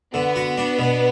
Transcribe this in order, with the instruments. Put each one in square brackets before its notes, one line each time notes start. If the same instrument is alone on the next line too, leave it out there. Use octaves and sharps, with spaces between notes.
[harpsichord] D3 [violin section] B3
[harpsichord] F#4
D4
B2